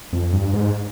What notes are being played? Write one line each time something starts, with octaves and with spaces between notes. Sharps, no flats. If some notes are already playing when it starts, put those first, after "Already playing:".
F2
G2
G#2